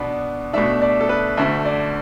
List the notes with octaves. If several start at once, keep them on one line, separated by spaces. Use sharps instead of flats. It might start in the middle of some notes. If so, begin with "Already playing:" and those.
Already playing: B2 B3 D4
B2 A3 D4 E5
D5
A4
B4
D2 D3 A3 E5
D5